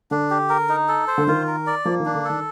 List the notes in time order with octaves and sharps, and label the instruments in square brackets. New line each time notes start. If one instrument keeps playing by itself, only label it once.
[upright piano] D3 [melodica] D4
[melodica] G4
A#4
D#4
A4
C5
[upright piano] D3
[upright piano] D#3 [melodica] F4
[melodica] A#4
D5
[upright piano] F3 [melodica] A#3
[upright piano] D#3
[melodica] D4
[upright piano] D3
[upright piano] D#3 [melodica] A4